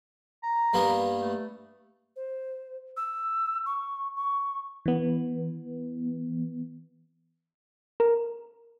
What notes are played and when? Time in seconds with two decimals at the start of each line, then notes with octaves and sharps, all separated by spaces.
0.43 A#5
0.73 G2 A#3 B3
1.21 A3
2.16 C5
2.97 E6
3.66 C#6
4.16 C#6
4.86 E3 B3
8.00 A#4